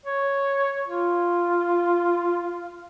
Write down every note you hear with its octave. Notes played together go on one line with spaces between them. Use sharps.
C#5
F4